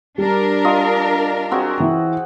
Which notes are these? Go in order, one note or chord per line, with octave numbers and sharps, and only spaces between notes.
G3 D4 A#4
F4 D#5
C4 F#4 G#4
E3